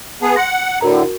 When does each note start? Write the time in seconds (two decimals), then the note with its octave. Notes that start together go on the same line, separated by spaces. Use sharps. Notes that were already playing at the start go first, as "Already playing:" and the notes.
0.22 B3 G#4 A5
0.36 F#5 C6 A#6
0.81 A2 D3 F#4 A#4 A#5